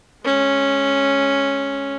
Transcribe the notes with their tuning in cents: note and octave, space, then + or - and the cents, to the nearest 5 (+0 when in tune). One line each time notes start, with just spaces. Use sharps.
G#3 +15 C#4 -5